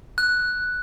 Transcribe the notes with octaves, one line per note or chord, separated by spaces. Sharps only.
F#6